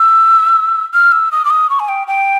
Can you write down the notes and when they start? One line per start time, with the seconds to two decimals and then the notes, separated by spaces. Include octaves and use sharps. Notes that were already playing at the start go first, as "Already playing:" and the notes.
Already playing: E6
0.94 F6
1.12 E6
1.32 D#6
1.45 D6
1.50 D#6
1.70 C#6
1.80 G#5
1.89 G5
2.07 G5